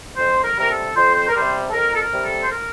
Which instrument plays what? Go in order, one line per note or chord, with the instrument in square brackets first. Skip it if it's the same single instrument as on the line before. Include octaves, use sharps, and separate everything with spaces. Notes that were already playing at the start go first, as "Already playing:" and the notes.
[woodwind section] F2 C5
A#4
C3 G3 A#4
A4
F2 C5
C5
A#4
C3 G3 C5
A4
F2 A#4
A4
A#4
C3 G3
A4
C5
A#4